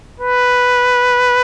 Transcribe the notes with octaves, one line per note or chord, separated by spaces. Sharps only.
B4